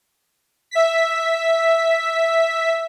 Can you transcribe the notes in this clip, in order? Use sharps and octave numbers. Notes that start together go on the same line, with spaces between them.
E5 B6